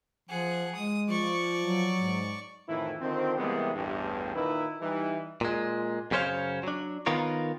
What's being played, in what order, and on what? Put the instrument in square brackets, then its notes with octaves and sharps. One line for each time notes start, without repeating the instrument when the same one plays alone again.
[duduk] F3 [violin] G#4 F#5
[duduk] G#3 [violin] D#6
[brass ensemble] F3 [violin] D5 C#6
[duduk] F#3
[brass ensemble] G#2
[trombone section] F2 A2 D#3 E3 E4
D3 D#3 F3 C4
C3 E3 G3 G#3 A#3 B3
A1 E2 G2
A#2 D#3 D#4 E4 B4
E3 G3 D#4
[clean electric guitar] A#2 G#3
F#2 C#3 C#4 C5 C#5 F5
F#3 D4
D#3 B3 F4 A#4 C#5